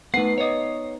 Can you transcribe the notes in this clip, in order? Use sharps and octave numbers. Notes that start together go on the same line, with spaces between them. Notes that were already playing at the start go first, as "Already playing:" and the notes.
A3 B3 D#4 B4 F#5 C7
C#5 D#5